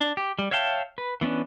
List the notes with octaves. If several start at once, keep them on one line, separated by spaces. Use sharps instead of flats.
D4
G4
G3
C#5 E5 F5 G5 A5
B4
E3 B3 C#4 D4